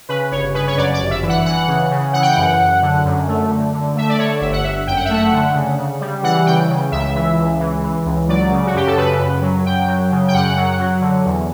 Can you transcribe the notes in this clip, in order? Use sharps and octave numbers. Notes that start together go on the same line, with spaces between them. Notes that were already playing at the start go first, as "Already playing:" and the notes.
C#3 B4
G1 C#5
C#3 B4
C#5
F#2 D5
D5
G1
E5
E3
F#5
E3 F#5
C#3
C#3
E3 F#5
G5
F#5
F#2
F#2
D3
F#2
A3
D3
D3
A3 E5
D5
D3 C#5
G1 E5
F#5
G1 E5
F#2 G5
F#5
E5
A3 F#5
D3
C#3
C#3
G3
E3 F#5
C#3 G5
C#3
C#2 E5
E3
C#2
E3
E3
C#2
F#3 D5
C#3
F#4
F#2 G4
A4
C#3 B4
F#2
F#3
F#2 G5
F#3
C#3
G5
F#2 F#5
F#3
F#3
D3
E2